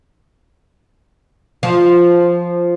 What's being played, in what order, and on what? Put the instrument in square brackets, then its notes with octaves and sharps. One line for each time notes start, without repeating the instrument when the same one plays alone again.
[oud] F3